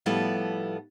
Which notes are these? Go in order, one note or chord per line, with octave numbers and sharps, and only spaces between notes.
A2 F3 G3 B3 E4 A4